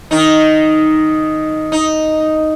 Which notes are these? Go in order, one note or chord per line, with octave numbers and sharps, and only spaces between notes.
D#3 D#4
D#4